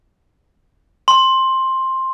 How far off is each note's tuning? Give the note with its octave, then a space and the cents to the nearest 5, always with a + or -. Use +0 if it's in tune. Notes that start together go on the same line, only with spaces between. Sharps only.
C6 +10